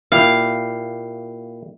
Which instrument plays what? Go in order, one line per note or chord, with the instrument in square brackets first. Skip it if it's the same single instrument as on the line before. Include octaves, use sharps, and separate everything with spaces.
[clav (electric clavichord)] A#2 E4 G4 [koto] F5